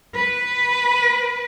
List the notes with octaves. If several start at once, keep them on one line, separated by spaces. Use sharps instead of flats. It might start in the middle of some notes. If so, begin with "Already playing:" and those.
B4